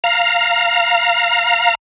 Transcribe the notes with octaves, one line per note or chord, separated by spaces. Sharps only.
F5 A#5